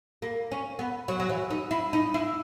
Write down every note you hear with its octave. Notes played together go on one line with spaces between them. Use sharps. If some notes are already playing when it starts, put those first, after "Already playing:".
A#3
C#4
B3
F#3
F#3
E3
D#4
E4
D#4
E4